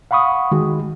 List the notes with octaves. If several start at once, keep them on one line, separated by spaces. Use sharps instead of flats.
F5 F#5 B5 C#6 D#6
D#3 G#3 F#4